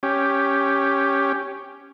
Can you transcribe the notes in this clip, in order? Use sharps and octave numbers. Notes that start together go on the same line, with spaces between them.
C#4 G4